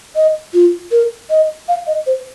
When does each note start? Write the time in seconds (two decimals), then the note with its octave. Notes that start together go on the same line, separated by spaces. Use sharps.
0.16 D#5
0.54 F4
0.91 A#4
1.30 D#5
1.68 F5
1.87 D#5
2.07 C5